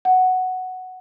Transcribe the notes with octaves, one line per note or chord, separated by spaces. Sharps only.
F#5